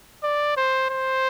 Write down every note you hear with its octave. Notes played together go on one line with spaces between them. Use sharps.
D5
C5
C5